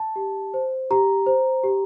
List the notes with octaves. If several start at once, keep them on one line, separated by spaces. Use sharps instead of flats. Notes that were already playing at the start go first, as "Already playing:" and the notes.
Already playing: A5
G4
C5
G4 A#5
C5
G4